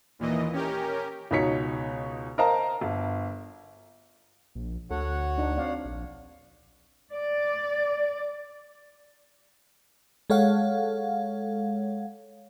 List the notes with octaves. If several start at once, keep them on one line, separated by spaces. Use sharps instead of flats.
D#2 A#2 E3 D#5
C#4 G4 A#4
C#2 B2 D#4 C#5 B6 C#7
A#4 C5 D#5 F5 A5 A#5
G1
A#1
D2 F#4 A4 C#5 F#5
D4 D#4
C4 D5 F5
A#1
D5
G#3 A4 C#5 F5 F#5